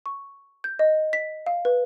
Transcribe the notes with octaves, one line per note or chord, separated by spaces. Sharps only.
C#6
G6
D#5
B6
F5
B4